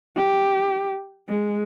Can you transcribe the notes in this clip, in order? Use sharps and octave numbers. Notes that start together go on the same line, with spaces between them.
G4
G#3